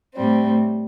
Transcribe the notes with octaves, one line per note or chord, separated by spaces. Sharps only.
A2 G3 C4